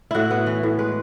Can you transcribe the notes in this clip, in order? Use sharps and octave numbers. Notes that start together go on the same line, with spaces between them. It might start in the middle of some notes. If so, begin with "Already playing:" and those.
A2 E4 F#4
B3
E3
A2
G#3 B4